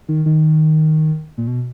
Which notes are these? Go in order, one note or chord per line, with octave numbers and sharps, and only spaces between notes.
D#3
D#3
A#2
B2